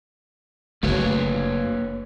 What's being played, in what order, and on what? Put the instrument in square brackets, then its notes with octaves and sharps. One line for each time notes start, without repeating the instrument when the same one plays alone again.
[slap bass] F#1 A3 [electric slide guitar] A#3 B4 C#5